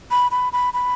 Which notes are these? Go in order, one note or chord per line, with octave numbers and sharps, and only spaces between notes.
B5
B5
B5
B5